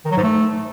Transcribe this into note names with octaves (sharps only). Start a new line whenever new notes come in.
D#3
F#3
G#2
A3